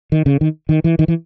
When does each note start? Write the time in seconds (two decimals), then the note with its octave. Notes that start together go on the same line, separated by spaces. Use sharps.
0.12 D#3
0.26 C#3
0.41 D#3
0.69 D#3
0.84 E3
0.99 D#3
1.08 E3